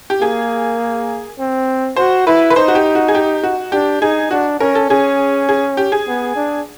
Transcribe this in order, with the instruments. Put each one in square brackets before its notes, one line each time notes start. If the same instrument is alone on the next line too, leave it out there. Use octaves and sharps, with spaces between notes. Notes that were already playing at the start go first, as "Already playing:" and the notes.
[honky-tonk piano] G4
[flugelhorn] A#3 [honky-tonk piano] G#4
[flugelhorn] C4
[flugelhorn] F#4 [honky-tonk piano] C5
[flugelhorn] E4 [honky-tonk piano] B4
[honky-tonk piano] B4
[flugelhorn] D#4 [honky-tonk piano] C5
[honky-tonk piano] F#4
G4
F#4
G#4
G4
F#4
[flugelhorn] D4 [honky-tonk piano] G4
[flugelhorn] D#4 [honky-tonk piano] G#4
[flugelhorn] D4 [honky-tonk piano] F#4
[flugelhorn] C#4 [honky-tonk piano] A#4
[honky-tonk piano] A4
[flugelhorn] C#4 [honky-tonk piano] G#4
[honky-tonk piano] G#4
G4
G#4
[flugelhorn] B3
D4